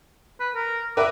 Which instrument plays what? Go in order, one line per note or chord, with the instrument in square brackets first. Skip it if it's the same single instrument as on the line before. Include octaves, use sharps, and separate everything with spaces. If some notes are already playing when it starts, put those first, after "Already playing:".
[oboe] B4
A#4
[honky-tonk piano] A#4 B4 E5 [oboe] D6